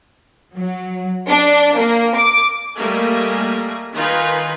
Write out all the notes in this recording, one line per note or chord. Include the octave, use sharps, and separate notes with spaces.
F#3
D4
A#3
D6
G3 A3 A#3 D#5 G#5
D#3 D#4 F4 B4 G#5